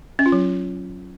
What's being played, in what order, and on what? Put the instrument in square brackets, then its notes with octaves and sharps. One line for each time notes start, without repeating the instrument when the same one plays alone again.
[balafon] C#4
F4
F#3